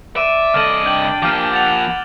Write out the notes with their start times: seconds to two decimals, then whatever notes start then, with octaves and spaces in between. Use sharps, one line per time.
0.16 D5 E5 D7 D#7
0.54 C2 A4 D#5 F6 A6 F#7
0.86 D4 G5 G6 F#7
1.23 F3 A#3 G4 D6 F6
1.54 F#5 A6 F7